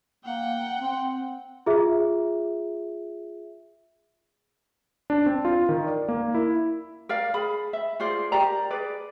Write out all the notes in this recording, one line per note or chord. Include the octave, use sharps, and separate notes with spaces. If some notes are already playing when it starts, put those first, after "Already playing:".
A#3 F#5 G5
C4
F4 G#4 E5
D4
C4
F4
D#3
D5
A#3
E4
A#4 D5 F5
G#4 B5
E5
F4 G#4 C5 D5
G4 A#4 D5 A#5
G#4 B4 D5